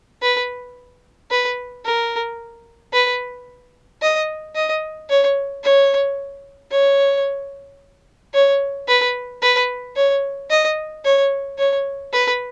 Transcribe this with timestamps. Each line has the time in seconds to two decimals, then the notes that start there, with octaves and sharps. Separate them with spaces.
0.22 B4
1.31 B4
1.85 A#4
2.93 B4
4.02 D#5
4.55 D#5
5.10 C#5
5.64 C#5
6.71 C#5
8.34 C#5
8.88 B4
9.42 B4
9.96 C#5
10.50 D#5
11.05 C#5
11.58 C#5
12.13 B4